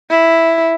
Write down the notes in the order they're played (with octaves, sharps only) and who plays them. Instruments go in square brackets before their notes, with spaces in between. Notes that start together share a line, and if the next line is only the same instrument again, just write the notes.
[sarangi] E4